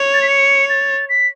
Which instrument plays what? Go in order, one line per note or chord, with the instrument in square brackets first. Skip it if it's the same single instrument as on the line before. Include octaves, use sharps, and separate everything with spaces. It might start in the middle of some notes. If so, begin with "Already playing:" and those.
Already playing: [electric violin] C#5
[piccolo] A6
B6
C#7
A6
B6